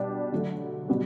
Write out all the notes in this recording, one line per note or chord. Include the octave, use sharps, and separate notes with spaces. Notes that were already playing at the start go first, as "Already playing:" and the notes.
Already playing: B2 G3 D4 G4
D3 F#3 A3
B2 G3 B3 F#4